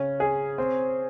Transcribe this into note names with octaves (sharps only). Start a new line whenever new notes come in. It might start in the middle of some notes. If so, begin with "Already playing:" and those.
Already playing: C#3 C#4
G#4
C4